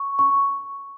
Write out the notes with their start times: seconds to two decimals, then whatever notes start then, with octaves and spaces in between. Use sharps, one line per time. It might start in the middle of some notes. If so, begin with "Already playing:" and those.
Already playing: C#6
0.19 C#6